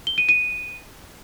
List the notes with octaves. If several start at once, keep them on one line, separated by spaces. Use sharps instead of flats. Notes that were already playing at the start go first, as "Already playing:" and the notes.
G7
D#7
D#7